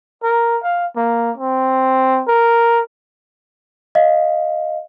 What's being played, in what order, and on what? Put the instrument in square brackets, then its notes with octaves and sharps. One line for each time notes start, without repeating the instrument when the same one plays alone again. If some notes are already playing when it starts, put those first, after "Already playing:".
[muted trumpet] A#4
F5
A#3
C4
A#4
[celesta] D#5 F5